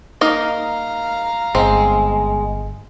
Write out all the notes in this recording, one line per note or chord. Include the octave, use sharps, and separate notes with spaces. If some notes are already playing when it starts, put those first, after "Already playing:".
A#3 D#4 A#4 F5 A#5
G1 G#3 C4